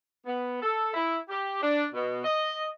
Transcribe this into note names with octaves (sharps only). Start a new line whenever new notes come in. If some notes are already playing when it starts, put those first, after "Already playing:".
B3
A4
E4
G4
D4
B2
D#5